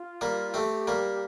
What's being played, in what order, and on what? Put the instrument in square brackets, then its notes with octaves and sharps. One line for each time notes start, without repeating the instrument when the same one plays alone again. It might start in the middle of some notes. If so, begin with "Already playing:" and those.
Already playing: [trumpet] F4
[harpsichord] G3 A#3
[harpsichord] A3 C4 [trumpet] G4
[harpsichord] G3 A#3